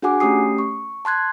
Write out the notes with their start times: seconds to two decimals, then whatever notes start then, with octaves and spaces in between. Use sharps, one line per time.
0.02 D4 F#4 G#4 F#5 G#5 D6
0.20 A3 C#4 G4 D#6 C7
0.58 C#6
1.05 A5 C6 F#6 G#6